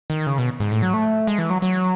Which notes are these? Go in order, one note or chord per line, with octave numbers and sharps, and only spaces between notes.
D#3
C#3
B2
G#2
A2
F#3
A3
G#3
E3
F#3
F#3